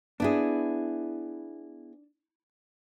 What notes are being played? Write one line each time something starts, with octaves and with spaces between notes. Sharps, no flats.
B3 D4 E4 G#4